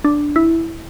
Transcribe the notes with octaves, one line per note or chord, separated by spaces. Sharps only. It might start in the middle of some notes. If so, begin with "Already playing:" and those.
D4
E4